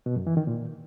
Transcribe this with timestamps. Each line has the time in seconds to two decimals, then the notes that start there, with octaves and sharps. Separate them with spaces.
0.06 B2
0.16 F#2
0.27 E3
0.37 D#3
0.47 A#2